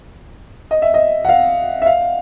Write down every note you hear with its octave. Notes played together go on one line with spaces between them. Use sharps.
D#5
E5
D#5
F#5
F5
E5
F5